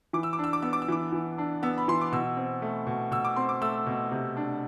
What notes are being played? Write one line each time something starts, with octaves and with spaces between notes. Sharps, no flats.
E3 D6
E6
D6
D4 E6
D6
B3 E6
D6
E6
E3 D6
E3
D4
B3 E6
B5
E3 C6
D6
B2 E6
C4
A3
B2
B2 E6
D6
C4 C6
D6
A3 E6
B2
C3
D4